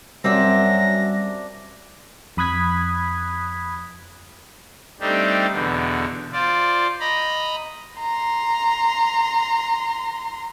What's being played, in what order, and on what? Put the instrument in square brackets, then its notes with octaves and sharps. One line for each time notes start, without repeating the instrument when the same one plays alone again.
[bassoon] F#2 [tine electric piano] G3 [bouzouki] C4 D4 E5 [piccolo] A#6
[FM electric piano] F2 B5 D#6 F#6 G#6 B6
[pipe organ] G3 A3 C4 D4 D#4 G4
E2 B2 D3
F4 C5 D5
D#5 A#5 B5
[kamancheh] A#5 C6